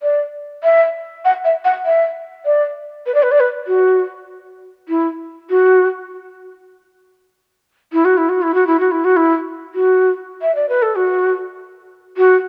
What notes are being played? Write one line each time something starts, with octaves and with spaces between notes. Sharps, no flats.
D5
E5
F#5
E5
F#5
E5
D5
B4
D5
B4
D5
B4
F#4
E4
F#4
E4
F#4
E4
F#4
E4
F#4
E4
F#4
E4
F#4
E4
F#4
E5
D5
B4
A4
F#4
F#4